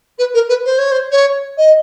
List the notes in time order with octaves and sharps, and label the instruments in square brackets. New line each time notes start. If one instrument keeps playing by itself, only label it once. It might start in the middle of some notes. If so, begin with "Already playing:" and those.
[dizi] B4
A#4
B4
C5
C#5
C5
C#5
D#5